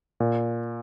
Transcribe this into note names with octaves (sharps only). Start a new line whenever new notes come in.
A#2